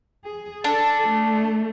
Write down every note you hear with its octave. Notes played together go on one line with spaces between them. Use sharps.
G#4
D4 A4
A3